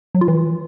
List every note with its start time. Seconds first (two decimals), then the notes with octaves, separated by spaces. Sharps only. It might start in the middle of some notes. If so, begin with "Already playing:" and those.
0.15 F#3
0.21 F4
0.28 E3